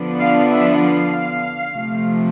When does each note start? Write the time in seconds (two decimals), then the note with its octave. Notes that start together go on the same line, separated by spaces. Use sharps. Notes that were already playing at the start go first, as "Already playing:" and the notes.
Already playing: D3 F3 B3 D4
0.20 F5
0.50 E5
0.81 F5
1.72 C3 F3 A3